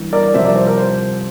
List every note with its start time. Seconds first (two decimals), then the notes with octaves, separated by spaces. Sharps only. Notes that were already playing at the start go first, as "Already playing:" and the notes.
Already playing: G2 E3
0.13 A#4 D5
0.34 C2 C3 F3 C5 E5
0.45 A#4 D5
0.56 C5
0.67 A#4
0.77 C5